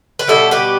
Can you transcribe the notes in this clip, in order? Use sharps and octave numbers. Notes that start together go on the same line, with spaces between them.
B4
B2 G3 B3 E4 A4
G4 B4